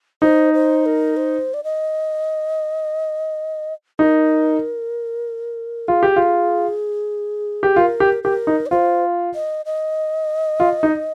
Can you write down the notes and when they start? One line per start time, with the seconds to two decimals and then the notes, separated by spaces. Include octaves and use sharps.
0.22 D#4 C5
0.54 C5
0.86 A#4
1.17 C5
1.54 D5
1.64 D#5
3.99 D#4 A#4
5.88 F4 G#4
6.03 G4
6.16 F4
7.63 G4
7.76 F4 A#4
8.00 G4
8.24 G4 A#4
8.47 D#4
8.66 D5
8.71 F4 C5
9.35 D#5
9.66 D#5
10.60 F4
10.83 D#4